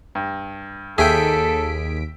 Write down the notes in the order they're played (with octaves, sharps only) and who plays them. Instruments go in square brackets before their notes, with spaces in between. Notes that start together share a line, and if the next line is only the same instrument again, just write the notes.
[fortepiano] G2
[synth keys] D#2 B6 D7 [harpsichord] G#4 [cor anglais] A4 [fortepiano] E5 G5